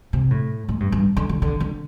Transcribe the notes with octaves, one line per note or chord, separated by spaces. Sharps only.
C3
A2
A2
G2
G2
D3
D3
D3
D3